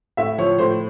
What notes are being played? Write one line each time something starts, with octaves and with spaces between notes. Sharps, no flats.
A2 E5
F3 C#5
A2 C5